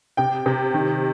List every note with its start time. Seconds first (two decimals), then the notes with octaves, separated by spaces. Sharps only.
0.17 C3 G5
0.46 C3
0.74 D#3